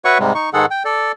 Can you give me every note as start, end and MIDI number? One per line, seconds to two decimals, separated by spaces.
0.05 0.18 66
0.05 0.18 71
0.05 0.18 73
0.05 0.18 76
0.05 0.18 78
0.05 0.18 85
0.19 0.33 44
0.19 0.33 48
0.19 0.33 55
0.19 0.33 56
0.35 0.50 63
0.35 0.50 85
0.53 0.66 44
0.53 0.66 51
0.53 0.66 56
0.53 0.66 68
0.53 0.66 69
0.53 0.66 78
0.71 0.83 79
0.85 1.12 69
0.85 1.12 74